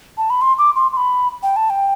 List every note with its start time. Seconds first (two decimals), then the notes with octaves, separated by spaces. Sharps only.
0.18 A5
0.30 B5
0.41 C6
0.58 D6
0.76 C6
0.92 C6
0.97 B5
1.43 G5
1.56 A5
1.70 G5